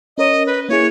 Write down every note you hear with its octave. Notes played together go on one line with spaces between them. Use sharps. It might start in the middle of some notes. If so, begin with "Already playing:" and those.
C#4 A#4 C#5 D#5
B4
A#3 E4 G#4 C#5